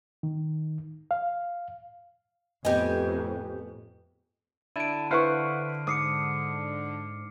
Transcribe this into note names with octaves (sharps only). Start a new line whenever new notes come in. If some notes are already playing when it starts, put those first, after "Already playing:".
D#3
F5
F2 A2 B3 G4 B4 D#5 G#5
D3 E4 A5 D7 D#7
E4 B4 C5 F5 F#5 C#6 F6 C7
G#2 D6 D#6 C7 C#7